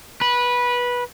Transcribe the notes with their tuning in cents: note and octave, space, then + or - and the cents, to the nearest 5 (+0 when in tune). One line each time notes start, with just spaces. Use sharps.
B4 -15